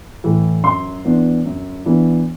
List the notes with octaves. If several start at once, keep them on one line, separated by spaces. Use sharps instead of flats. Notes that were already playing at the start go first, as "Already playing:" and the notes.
A2 E3
F#2 C6
E3 B3 D4
F#2
E3 B3 D4